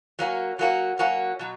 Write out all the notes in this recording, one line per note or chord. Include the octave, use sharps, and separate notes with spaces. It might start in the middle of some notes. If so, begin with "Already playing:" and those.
F#3 A#3 C#4 F#4
F#3 A#3 C#4 F#4
F#3 A#3 C#4 F#4
B2 F#3